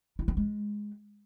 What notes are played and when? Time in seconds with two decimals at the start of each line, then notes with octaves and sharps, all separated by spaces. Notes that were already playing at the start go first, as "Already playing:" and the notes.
0.19 E4
0.28 B3
0.37 G#3